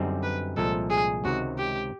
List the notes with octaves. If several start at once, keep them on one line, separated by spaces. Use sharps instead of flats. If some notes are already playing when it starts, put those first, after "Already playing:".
Already playing: F#2 D3 G3 C4 D#4
B4
C2 A#2 F3 G#3 A4
G#4
C#2 C3 D#3 F#4
G4